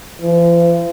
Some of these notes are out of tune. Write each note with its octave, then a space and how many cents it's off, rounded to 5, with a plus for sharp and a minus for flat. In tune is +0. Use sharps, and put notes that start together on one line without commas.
F3 -45